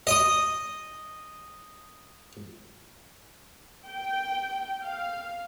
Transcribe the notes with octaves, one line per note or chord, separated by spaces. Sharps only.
D#5 D#6
G5
F5